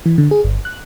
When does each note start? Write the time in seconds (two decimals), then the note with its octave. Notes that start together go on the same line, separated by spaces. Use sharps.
0.06 E3
0.18 D3
0.31 G#4
0.44 G1
0.65 F#6